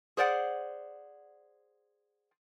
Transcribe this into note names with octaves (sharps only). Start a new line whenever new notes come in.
G#4 C5 D5 F5 F#5